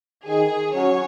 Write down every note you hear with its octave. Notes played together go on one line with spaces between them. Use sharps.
D#3 G#4
F#3 C#4 F#4 C#5